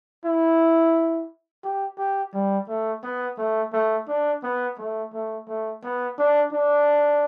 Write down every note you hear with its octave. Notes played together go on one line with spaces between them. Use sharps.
E4
G4
G4
G3
A3
B3
A3
A3
D4
B3
A3
A3
A3
B3
D4
D4